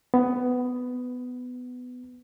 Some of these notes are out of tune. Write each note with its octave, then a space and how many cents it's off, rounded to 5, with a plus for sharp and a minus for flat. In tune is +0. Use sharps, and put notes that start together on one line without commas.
B3 +15